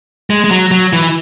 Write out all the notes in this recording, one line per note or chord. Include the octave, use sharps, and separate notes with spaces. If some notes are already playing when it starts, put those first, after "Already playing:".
G#3
G#3
F#3
F#3
E3